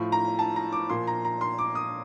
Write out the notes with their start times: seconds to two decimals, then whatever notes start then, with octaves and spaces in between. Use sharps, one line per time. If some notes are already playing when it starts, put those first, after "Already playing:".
Already playing: A2 F3
0.12 A#5
0.39 A5
0.56 A#5
0.72 D6
0.89 A#2 F3 C6
1.07 A#5
1.25 A#5
1.41 C6
1.58 D6
1.75 D#6